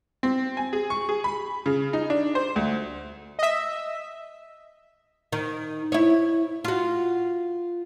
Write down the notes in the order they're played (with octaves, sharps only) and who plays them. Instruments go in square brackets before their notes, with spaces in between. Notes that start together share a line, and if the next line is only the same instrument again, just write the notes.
[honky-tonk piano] C4
G#5
G#4
C#6
G#4
B5
C#3
D#4
D4
C5
D2
[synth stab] D#5 E5
[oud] D#3
E4 C#5
F4 F#4